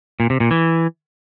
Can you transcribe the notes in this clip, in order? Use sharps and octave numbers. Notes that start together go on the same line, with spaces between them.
A#2
C3
A#2
E3